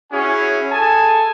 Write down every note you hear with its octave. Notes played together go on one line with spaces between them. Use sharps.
C#4 E4 F#4 G#4 C#5 G#5
G#4 A4 G#5 A5